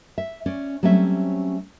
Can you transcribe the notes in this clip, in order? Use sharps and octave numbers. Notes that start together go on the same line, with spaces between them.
E5
C#4 D5
F#3 G3 A3 C4 C#4 E5